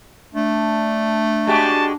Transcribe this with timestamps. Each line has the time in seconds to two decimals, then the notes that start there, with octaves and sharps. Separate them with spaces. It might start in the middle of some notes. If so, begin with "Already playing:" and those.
0.35 A3 D4
1.47 G#3 F#4 G4 A5